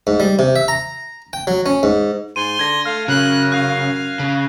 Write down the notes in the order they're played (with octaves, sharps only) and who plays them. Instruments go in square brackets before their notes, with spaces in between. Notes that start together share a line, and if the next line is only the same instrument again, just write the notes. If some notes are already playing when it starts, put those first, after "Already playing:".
[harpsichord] G#2
G3
C3
E5
A#5
G5
F#3
C#4
G#2
[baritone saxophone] G#2 [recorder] C6 [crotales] D#7
[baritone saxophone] D3 [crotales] G#6 A#6
[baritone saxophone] A3 [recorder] F5 [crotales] F6
[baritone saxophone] F#2 [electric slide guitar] C#3 [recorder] F#6
[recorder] F5 [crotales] F#6
[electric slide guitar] C#3